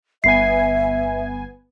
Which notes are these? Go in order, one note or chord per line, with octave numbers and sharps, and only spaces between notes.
G1 B3 E5 G#5 C7